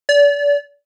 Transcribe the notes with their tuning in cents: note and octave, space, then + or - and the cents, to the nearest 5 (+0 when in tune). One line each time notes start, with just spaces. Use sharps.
D5 -35